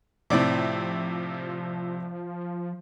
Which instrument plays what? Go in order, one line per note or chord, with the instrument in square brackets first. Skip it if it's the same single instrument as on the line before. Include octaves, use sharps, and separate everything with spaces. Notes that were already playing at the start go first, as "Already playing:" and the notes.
[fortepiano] A2 D5 D6 [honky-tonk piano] C3 C4 [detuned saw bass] F3